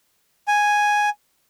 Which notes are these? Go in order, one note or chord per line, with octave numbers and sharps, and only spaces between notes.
G#5